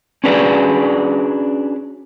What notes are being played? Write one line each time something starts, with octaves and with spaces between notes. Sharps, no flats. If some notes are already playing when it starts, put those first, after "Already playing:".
C#4 D4 F#4 G#4 B4 D5